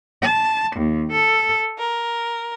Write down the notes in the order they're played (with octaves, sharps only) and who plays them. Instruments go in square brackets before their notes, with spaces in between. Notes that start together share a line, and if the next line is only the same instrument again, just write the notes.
[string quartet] A5
D#2
A4
A#4